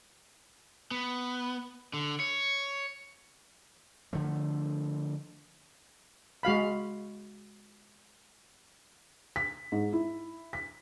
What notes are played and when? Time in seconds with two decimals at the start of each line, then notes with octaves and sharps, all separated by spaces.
0.91 B3
1.93 D3
2.20 C#5
4.13 D3 F3 A3
6.43 G#3 F#4 F5 B5
9.36 B6
9.72 G#2
9.93 E4
10.53 B6